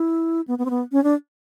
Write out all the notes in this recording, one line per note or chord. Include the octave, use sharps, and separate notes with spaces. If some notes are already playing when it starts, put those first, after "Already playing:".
Already playing: E4
B3
B3
C4
B3
C#4
D4